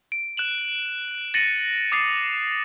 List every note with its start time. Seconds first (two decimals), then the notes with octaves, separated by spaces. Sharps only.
0.12 D7
0.37 F#6 E7 F#7
1.34 A6 A#6 C#7 D#7 F#7
1.92 D6 D#6 A6 C7